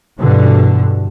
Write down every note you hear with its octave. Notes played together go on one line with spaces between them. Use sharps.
G2 B2 D3 E3